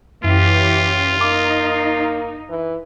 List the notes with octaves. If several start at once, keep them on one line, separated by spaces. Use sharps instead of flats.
F#2 E3 C#4 F4 G4
A#3 D#4 D6
E3